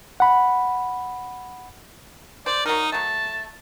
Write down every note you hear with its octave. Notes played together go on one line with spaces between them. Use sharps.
F#5 B5
C5 D5
F#3 D#4 A#4
F#3 A3 A5